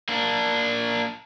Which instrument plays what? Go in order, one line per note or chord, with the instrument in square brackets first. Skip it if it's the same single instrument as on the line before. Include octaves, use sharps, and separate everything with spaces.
[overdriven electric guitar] A#3 D4